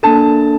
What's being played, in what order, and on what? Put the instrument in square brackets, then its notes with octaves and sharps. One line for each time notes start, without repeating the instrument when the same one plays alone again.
[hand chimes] A#3 D4 A4 [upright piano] A5